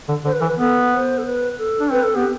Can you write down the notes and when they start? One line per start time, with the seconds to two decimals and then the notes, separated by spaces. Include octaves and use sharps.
0.08 D3
0.25 D3 C5
0.33 B4
0.41 E3 A4
0.47 B4
0.59 B3 A4
0.93 C5
1.18 A4
1.26 B4
1.58 A4
1.79 D4
1.91 C4 B4
2.03 A4
2.15 B3 G4